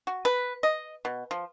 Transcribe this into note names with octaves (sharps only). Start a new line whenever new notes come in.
F#4
B4
D#5
B2
F3